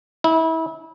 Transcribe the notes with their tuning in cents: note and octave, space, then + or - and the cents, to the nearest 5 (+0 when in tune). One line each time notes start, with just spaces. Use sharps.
E4 -30